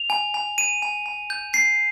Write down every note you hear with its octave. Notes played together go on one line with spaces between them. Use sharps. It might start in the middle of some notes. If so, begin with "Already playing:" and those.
Already playing: F7
G#5
G#5
G#5 D#7
G#5
G#5
G6
G6 C7